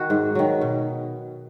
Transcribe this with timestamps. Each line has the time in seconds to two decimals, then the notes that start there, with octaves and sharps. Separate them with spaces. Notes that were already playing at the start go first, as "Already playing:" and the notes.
Already playing: D#3 F#4
0.10 G#2
0.35 D#3 F#3
0.61 B2